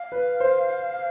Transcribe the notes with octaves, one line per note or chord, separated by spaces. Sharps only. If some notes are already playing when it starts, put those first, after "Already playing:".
Already playing: F5
B4
C5